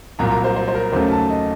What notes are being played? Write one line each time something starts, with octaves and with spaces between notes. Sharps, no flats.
C2 A#2 F#3 A#5
A#5
C5
C5
C5
A#4
D#2 C#3 F#3 A3 C#4 C5
A5
D#5